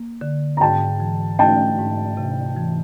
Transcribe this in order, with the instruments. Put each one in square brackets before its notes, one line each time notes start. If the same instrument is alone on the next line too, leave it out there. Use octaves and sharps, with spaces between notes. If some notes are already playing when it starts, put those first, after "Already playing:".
Already playing: [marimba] A#3
D3
[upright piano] A#5
[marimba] G#2 [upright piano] G5 A5
[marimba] E3
[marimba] A3 [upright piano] G5 A5
[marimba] G#2
C3
E3